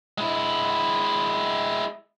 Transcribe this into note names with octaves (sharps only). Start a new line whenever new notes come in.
G#3 E4